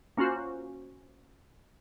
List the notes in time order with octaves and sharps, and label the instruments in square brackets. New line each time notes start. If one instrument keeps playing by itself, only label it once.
[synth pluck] A#3 C#4 F4 F#4 C5